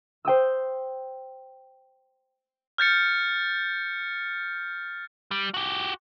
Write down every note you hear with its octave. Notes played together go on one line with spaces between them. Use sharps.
C5 G5 D#6 E6
F6 G6 A6 C#7
G3
F#4 G4